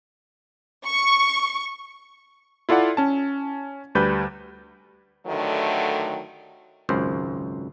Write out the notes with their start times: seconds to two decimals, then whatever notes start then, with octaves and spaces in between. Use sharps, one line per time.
0.85 C#6
2.69 E4 F4 A4 D5 F#5
2.97 C#4 A5
3.95 D2 G3 B4 G6
5.26 G2 D3 D#3 F#3 A3
6.89 G#1 C#2 F#2 C5